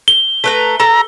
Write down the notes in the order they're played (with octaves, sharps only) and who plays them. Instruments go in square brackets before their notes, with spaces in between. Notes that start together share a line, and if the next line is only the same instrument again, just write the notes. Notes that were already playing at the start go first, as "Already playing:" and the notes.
[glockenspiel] G7
[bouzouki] A3 B4 A#5
[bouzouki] A4 [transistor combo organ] A#5